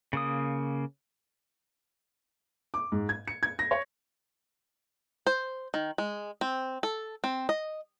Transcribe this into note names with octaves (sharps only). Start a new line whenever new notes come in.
C#3 A#3 D#6
D6
G#2
G#6
C#7
G#6
A#6
C#5
C5
D#3
G#3
C4
A4
C4
D#5